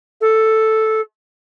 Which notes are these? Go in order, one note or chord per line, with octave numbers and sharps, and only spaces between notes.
A4